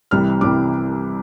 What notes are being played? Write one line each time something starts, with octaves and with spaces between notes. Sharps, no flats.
C2 C3 E3 G3 F6
C2 C3 E3 G3 D6